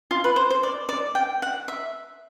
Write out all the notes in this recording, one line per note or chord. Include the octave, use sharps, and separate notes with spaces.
F4
B4
C5
C5
D5
D5
G5
F#5
E5